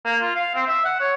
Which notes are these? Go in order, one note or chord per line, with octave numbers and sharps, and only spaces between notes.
A#3
F4
F5
C4
E5
F#5
C#5